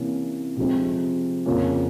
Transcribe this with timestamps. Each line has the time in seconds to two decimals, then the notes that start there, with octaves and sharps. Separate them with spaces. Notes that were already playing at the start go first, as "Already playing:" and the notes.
Already playing: C3 E3 A#3 C#4
0.57 C3 F3 G#3 C4
1.46 F2 C#3 F3 A#3 C#4